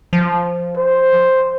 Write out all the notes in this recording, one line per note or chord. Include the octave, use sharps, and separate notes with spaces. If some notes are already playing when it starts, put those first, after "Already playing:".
F3
C5